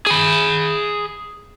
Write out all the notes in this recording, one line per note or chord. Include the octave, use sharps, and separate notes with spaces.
G#4 B5